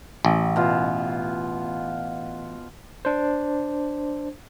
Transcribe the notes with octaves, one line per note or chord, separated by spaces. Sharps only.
A1
B2 F4
D4 C5